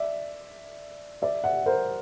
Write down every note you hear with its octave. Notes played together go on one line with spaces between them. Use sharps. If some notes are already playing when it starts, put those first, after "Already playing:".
Already playing: D5 E5
D5 E5
E5 F#5
A#4 C5